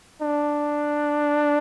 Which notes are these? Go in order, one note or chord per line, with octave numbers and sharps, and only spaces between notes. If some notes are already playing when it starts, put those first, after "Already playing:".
D4